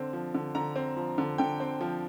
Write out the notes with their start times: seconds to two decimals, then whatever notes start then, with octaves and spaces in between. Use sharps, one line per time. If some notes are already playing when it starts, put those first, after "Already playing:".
Already playing: D3 C4
0.13 F3
0.35 D3
0.55 D3 A#5
0.76 C4
0.97 F3
1.18 D3
1.38 D3 G5
1.60 C4
1.81 F3